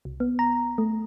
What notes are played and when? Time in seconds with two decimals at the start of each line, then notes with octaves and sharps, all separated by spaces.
0.05 C2
0.20 B3
0.39 A#5
0.78 A3